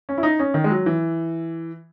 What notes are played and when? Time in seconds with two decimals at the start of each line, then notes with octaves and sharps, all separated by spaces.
0.09 C#4
0.18 E4
0.23 D#4
0.39 C#4
0.54 D#3
0.64 G#3
0.71 F#3
0.86 E3